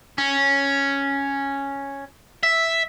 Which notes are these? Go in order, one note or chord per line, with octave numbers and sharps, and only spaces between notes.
C#4
E5